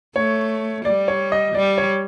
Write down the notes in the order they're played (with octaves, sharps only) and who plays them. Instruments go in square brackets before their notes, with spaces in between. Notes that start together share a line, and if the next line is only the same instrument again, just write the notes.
[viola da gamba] A3 [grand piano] C#5
[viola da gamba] G3 [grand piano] D5
[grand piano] C#5
D#5
[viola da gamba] G3 [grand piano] D5
[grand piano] C#5